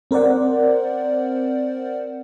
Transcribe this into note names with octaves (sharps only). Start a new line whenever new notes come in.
C4 A#4 C5 D5 F#5